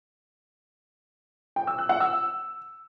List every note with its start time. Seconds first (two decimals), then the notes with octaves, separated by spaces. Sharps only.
1.56 G5
1.67 E6
1.78 F#6
1.89 F#5
2.00 E6